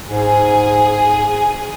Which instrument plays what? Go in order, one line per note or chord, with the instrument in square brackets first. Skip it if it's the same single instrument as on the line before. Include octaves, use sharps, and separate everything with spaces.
[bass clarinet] G#2 [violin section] G#4 G#5